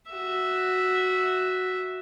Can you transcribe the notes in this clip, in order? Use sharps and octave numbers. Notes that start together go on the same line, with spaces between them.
F#4 E5